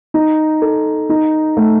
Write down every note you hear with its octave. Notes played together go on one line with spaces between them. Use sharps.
D#4
A4
D#4
A3